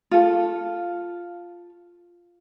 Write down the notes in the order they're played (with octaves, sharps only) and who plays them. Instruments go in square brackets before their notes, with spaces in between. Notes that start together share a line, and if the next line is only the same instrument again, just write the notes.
[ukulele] F4 A4